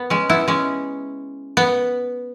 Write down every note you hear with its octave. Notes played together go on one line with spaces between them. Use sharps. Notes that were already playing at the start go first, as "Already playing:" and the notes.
Already playing: B3
G#3 C#4
B3 E4
G#3 C#4
B3